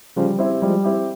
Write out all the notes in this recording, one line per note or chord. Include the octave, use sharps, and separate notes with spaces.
C#3 F3 G3
C4 E4 G4
F3 G3 G#3
C4 E4 G4